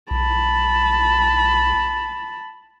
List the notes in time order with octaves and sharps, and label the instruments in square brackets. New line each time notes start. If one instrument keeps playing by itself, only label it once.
[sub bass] B1 [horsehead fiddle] A5 B5